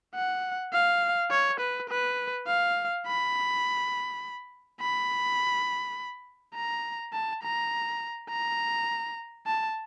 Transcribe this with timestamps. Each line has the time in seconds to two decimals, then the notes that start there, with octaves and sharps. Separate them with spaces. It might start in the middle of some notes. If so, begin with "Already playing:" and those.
0.15 F#5
0.73 F5
1.31 C#5
1.60 B4
1.89 B4
2.47 F5
3.06 B5
4.80 B5
6.55 A#5
7.13 A5
7.43 A#5
8.30 A#5
9.46 A5